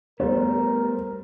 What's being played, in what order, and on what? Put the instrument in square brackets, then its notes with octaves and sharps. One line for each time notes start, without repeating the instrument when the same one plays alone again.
[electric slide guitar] G3 A3 B3 [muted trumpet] A#4 [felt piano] C5